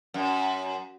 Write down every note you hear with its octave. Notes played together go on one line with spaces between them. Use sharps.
F#2